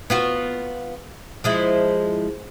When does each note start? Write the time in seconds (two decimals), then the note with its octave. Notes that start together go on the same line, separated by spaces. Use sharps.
0.10 B3 F4 F#4
1.44 F3 G#3 E4